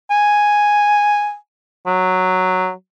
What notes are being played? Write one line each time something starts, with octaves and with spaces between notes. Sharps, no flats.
G#5
F#3